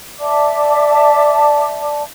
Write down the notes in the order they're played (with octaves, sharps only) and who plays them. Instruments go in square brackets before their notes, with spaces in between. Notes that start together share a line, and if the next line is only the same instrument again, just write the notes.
[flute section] D5 E5 A5 D6